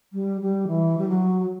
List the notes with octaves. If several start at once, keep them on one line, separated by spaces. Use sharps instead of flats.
G3
G3
E3
G3
F#3